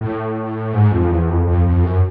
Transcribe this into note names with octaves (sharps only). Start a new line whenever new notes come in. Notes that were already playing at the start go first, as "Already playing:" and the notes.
A2
G#2
F2
E2
F2
F2
F2
F#2